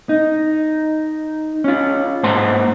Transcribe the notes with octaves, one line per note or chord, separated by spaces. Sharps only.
D#4
C#4 F4
G#2 A#3 C5 F#5 A5 C6